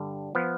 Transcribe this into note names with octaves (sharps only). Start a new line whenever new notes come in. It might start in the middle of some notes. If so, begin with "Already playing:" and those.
Already playing: G2 D3 G3
F3 B3